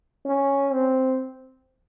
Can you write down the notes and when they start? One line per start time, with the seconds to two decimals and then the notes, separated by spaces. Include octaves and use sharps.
0.25 C#4
0.73 C4